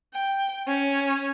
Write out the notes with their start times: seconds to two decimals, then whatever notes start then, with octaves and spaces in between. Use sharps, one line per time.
0.14 G5
0.68 C#4